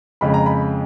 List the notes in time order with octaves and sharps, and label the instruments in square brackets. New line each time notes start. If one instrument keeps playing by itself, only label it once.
[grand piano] F2 C#3 G#3 B5
A#5
B5